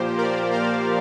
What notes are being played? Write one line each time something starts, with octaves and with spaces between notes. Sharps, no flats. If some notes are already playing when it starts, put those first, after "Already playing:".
Already playing: A#2 F3 A#3 G4 C5
A#4 D5
C5 F5